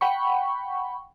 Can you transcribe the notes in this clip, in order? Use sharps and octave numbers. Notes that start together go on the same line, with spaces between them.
F#5 G5 B5 C#6